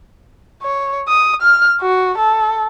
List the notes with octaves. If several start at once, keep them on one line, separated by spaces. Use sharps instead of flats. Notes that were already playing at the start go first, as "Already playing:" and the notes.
C#5
D#6
F6
F#4
A4